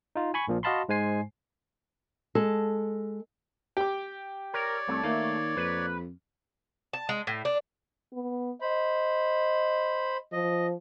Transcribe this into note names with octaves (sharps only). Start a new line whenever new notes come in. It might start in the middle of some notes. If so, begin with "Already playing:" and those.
D#4 F4
G#5 B5 C#6
A#1 A#2 F3
F#4 D#5 F5 A5 B5 C6
G#2 G#3 C5 G#5 C7
G#3 A4
G4 D6
A#4 C#5 D5
C2 A3
D#3 A#3
F2 B4
A5
G#3
A2
D4
B3
C5 D#5 B5
F3 D#5